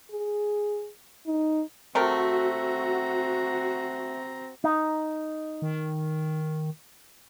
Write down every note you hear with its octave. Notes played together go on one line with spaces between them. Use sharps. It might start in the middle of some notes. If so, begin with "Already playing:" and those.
G#4
D#4
C3 A3 C4 F#4 A#4 A#5
D#4
D#3